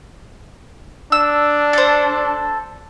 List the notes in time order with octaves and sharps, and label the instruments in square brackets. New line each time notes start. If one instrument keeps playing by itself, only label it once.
[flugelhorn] D4 [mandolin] E6
[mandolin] A4 C5